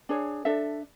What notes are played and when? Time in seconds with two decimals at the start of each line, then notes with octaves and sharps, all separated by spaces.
0.09 D4 G#4 C#5
0.45 D4 A4 E5